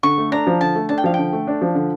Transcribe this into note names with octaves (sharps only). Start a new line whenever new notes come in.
D3 C#6
A3
D4 A#5
F3
D3 A5
A3
D4 A5
G5
F3 F5
D3 G5
A3
D4
F3
D3